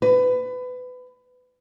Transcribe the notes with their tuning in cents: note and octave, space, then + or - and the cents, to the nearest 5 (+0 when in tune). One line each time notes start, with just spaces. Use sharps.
B4 +25